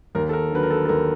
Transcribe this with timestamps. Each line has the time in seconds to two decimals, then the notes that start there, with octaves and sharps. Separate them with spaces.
0.15 D#2 A#4
0.29 A4
0.33 A#4
0.52 D3 F#3 B4
0.63 A#4
0.70 A4
0.85 A4
0.89 D#2 A#4